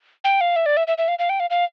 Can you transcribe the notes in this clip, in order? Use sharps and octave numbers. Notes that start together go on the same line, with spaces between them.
G5
F5
E5
D5
E5
E5
E5
F5
F5
G5
F5
F5